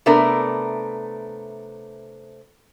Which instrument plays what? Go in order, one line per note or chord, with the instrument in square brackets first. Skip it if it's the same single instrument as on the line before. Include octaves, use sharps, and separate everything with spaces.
[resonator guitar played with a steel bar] C3 A3 B3 D4 A#4